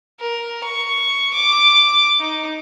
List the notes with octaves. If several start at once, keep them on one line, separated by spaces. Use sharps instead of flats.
A#4
C#6
D6
D#4